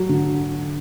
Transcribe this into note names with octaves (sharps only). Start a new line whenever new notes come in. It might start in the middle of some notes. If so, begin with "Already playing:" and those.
Already playing: F#3
D3